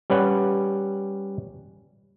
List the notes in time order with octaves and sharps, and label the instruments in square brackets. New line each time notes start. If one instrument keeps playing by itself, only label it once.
[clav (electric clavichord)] G3 C#4 B4 F#5